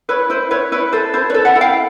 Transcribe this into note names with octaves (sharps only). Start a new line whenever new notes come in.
E4 B4 C#5
E4 C5
E4 B4 C#5
E4 B4 C#5
A4 C5
E4 C5
B4 C#5
A4
E5 F#5
E4
F5 G5